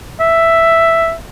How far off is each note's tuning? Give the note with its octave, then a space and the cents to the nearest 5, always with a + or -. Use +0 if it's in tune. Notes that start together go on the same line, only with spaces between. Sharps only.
E5 +5